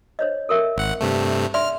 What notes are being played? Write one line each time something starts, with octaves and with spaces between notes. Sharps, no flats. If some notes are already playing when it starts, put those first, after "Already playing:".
C5 C#5 D#5
A4 A#4 E5
G#1 F#5
G2 C3 A3
D5 E5 C6 F6